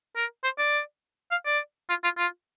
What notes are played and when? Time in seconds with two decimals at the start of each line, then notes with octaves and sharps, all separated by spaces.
0.16 A#4
0.44 C5
0.58 D5
1.31 F5
1.46 D5
1.89 F4
2.03 F4
2.18 F4